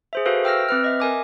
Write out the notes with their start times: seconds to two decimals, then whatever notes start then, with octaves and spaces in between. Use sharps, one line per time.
0.13 G#4 C5 E5
0.26 F#4 A4 B4 C5 F5
0.44 E5 G5 E6 F6 A#6
0.69 C4 B4 F6
0.84 D#5 E5
1.00 A#4 G#5 D6